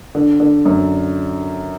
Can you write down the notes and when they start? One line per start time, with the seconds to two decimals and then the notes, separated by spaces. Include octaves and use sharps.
0.15 D3
0.40 D3
0.65 F#2